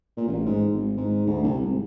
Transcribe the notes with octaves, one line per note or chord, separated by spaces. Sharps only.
A#2
A1
G#2
G#1
G#2
D2
C2
G#1